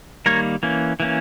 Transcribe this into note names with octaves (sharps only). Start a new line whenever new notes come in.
D#3 G3 A#3 A#4 C#5
E3 A#3 C#4
E3 A#3 C#4